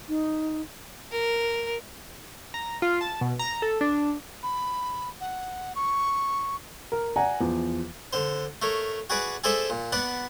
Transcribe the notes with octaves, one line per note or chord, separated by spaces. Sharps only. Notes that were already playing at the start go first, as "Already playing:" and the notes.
D#4
A#4
A#5
F4
A5
B2
A#5
A4
D4
B5
F#5
C#6
A#4
D5 F#5 G#5 A#5
E2 F3
D3 C5
A3 A#4 C#5
F#4 G#4 B4 D5 D6
G#4 A4 C5 D5 E5 A5
A#2
B3 B4 D5 F#5